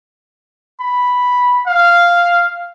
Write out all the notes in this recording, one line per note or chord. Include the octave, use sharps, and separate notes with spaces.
B5
F5